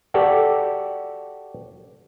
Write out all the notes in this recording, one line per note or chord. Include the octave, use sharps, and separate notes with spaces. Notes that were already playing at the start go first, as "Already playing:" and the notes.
F#4 G4 A4 D5